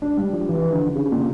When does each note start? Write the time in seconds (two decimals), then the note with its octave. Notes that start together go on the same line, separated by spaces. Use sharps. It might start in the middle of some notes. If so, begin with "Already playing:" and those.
0.02 D4
0.17 G3
0.33 F3
0.49 E3
0.72 D3
0.89 D3
0.95 C#3
1.12 A#2